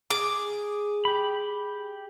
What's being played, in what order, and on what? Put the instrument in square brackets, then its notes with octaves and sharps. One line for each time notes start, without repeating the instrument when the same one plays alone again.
[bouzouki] G#4 [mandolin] D6
[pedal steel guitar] G4 B5